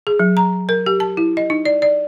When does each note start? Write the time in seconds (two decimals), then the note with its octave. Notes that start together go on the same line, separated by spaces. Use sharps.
0.07 G#4
0.19 F#3
0.37 A#5
0.69 A#4
0.86 G4
1.00 A5
1.17 E4
1.37 D#5
1.50 D#4
1.65 D5
1.82 D5